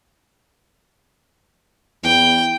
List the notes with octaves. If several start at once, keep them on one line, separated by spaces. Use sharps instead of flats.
E2 G5